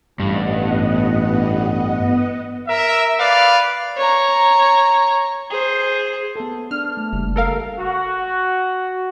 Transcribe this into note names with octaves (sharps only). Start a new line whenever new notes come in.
A1 G2 B3 D#5 F#5
A#4 E5
B4 D5 F5
C#5 A#5
G#4 C5
B3 A4
D4 F6
A3
F#1 G3
A4 A#4 F5
F#4